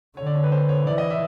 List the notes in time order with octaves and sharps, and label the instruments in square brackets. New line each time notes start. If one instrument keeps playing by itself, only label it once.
[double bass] D3 [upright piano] C#5
[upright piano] D5
C#5
B4
C5
C#5
[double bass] E3 [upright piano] D5
[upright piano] D#5
E5